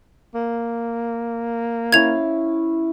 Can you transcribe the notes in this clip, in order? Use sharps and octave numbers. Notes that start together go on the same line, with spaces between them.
A#3
C#4 E4 F5 G#6 F7